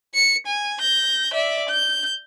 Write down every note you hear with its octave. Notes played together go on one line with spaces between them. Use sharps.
C#7
G#5
G6 A#6
D5 E5
G6